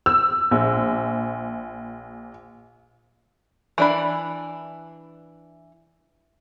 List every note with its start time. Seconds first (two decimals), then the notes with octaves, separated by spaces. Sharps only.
0.06 E6
0.51 A#1
3.78 E3 D4 B5